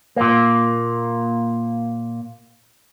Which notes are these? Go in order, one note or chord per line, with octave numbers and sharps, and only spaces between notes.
A#2 A#3